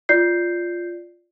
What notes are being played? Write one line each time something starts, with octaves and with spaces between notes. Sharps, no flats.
F4 D5 G6 C7